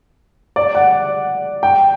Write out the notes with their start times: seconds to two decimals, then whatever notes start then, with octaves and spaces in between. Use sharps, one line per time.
0.56 D5
0.75 F#5
1.63 G5